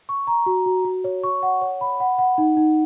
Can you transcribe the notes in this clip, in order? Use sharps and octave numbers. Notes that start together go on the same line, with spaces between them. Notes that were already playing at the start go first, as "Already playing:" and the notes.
C#6
A#5
F#4
F#4
F#4
C#5
C#6
F#5
C#5
B5
F#5
F#5
D#4
D#4